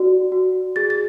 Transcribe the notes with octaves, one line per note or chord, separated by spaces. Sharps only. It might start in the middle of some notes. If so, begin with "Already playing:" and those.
Already playing: F#4 D5
F#4
G#4 A6
A6